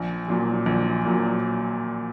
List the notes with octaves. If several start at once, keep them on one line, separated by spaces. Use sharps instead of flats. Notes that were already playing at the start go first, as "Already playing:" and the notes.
Already playing: A#1
A#2 F#3
A#1
A#2 F#3